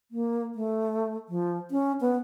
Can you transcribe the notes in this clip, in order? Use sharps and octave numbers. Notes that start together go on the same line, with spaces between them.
A#3
A3
F3
C#4
B3